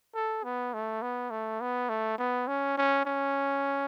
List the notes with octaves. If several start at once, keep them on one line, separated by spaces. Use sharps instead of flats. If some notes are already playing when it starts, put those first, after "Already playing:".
A4
B3
A3
B3
A3
B3
A3
B3
C#4
C#4
C#4